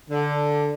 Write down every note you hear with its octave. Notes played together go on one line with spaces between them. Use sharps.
D3